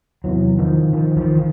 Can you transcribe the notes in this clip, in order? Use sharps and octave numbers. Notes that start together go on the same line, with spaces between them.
E2 C3 E3 F#3
D#3 F3
D#3 F3
D#3 F3
D#3